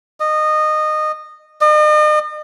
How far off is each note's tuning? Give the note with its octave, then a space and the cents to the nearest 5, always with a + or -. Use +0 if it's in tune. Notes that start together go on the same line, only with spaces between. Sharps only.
D#5 -20
D#5 -40